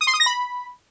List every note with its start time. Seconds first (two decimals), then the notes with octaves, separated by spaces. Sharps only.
0.01 D#6
0.07 C6
0.14 D#6
0.20 A#6
0.26 B5